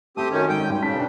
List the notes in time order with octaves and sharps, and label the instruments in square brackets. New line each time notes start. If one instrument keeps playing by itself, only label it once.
[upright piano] A3 [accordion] C4 G4 D#6
[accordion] F#2 D#3 C#4
[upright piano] G#1 [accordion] G5
[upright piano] D#1 G#1
[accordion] C#3 [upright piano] C#4 A5 B6
[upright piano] B2 D4